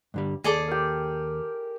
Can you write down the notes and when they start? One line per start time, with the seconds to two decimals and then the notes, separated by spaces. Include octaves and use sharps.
0.14 G2 D3 G3
0.44 D#2 G#4 A4 D5 A5 D6
0.68 G4 A#4